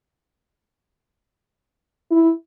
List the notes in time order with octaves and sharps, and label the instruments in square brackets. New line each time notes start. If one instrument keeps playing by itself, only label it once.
[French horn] E4